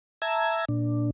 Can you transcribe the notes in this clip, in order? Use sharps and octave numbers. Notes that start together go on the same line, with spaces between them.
E5 A5 A#5 E6 G#6
A#2 D4